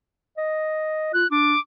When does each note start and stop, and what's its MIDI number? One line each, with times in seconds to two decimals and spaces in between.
0.37 1.10 75
1.14 1.24 65
1.14 1.27 90
1.31 1.55 62
1.31 1.59 86